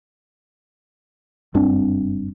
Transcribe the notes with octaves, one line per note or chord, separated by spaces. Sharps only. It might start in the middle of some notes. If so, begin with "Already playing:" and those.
F#1 G2 C4 D4